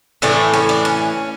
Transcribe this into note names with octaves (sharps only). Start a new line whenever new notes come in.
A2 E3 A3 D4
C#4
D4
C#4